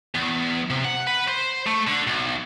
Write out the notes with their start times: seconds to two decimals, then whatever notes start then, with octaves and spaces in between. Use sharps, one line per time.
0.15 E2
0.70 C3
0.85 F#5
1.07 B4
1.28 C5
1.67 A3
1.87 D3
2.07 B1